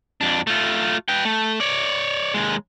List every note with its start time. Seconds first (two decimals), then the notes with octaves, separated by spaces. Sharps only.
0.21 F2 D4
0.47 A3 F4
1.08 B4 G5
1.25 A3
1.60 C#5 D5
2.34 D#2 G#3